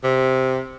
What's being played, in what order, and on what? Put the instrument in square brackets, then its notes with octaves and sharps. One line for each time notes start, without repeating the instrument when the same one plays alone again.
[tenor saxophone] C3